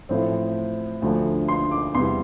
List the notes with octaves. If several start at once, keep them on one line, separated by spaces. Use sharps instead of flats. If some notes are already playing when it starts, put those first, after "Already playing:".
A1 A2 F3 A3 C4
D2 D3 F3 A3
C6
D6
E2 C3 G3 C6